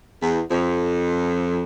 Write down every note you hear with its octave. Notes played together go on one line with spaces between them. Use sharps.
E2
F2